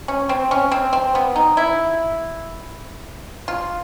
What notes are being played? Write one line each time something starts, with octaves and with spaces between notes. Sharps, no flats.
C#4
C4
C#4
C4
C4
B3
D#4
E4
F4